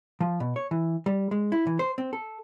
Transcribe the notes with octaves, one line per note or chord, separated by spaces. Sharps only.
F3
B2
C#5
E3
G3
G#3
E4
E3
C5
C4
A4